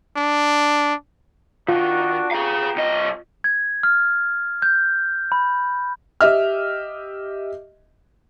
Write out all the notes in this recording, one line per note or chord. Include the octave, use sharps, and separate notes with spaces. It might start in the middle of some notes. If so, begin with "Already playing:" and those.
D4
D#3 D4 F4 F#4
B3 G4 G#4 F5 A#5
C2 D#5
G#6
F6
G6
B5
G4 D#5 E5 F6